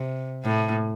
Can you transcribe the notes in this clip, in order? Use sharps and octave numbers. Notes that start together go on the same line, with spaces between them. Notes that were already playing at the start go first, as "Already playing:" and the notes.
Already playing: C3
A2